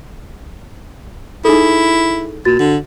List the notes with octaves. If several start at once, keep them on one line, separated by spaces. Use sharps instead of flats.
D#4 E4 G#4 A4
A#2 F#4 A6
D3